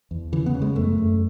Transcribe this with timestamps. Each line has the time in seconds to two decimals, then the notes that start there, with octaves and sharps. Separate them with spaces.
0.11 E2
0.32 C#3 E3
0.46 B3
0.54 C#3
0.62 G#3
0.75 F#2 A3
0.98 F#2